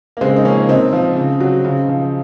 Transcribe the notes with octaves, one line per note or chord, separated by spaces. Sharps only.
A#3
C#3 G#3 C4
D#4
F3 A#3 C#4
C3 C4 D#4
F3
C#3
F#3
C#3
F3